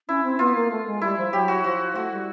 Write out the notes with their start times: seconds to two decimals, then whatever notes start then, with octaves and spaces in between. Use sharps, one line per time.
0.08 C#4 E4
0.23 C4
0.39 B3 F4
0.55 A#3
0.71 A3
0.86 G#3
1.01 G3 E4
1.18 F3
1.33 F#3 G4
1.48 F#4
1.64 F3 F#4
1.95 A3 F#4
2.12 G3